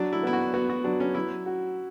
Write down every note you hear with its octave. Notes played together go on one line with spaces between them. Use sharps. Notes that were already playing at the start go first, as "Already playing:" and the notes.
Already playing: F#3 D4
E4
B3 E4
F#4
B3 F#4
F#4
F#3 D4
C#4
F#3 E4
F#4